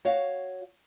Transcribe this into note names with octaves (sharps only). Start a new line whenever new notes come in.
F#4 C#5 F5